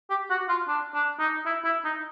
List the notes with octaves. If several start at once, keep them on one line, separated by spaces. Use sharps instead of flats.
G4
F#4
F4
D4
D4
D#4
E4
E4
D#4